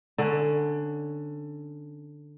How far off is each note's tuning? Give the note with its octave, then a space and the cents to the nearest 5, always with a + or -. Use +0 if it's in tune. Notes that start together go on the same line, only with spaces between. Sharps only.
D3 +10 C#4 +0